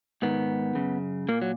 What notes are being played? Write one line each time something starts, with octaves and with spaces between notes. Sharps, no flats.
G#2 D#3 B3
F#2 C#3
A#2 A#3
F#3